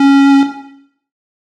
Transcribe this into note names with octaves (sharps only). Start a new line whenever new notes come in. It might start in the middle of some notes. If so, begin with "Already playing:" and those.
Already playing: C#4